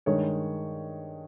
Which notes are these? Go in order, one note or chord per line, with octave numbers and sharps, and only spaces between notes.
G2 D#3 G#3 C#5